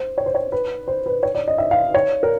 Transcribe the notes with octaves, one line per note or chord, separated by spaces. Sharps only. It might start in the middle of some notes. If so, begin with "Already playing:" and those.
Already playing: C5
C#5
C5
C#5
B4
C5
B4
C#5
D5
D#5
E5
F5
C#5
A#4